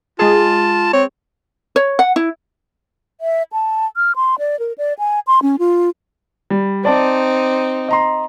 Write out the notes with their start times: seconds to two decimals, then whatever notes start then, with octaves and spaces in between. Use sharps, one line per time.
0.19 G#3 F4 G#4 A5
0.93 C4 C#5
1.76 C#5
1.99 F#5
2.16 E4
3.21 E5
3.53 A5
3.96 F6
4.16 C6
4.39 D5
4.59 A#4
4.78 D5
4.99 G#5
5.27 C6
5.42 C#4
5.59 F4
6.50 G3
6.85 C4 D#4 D5 A5 D6
7.89 D#5 A#5 C6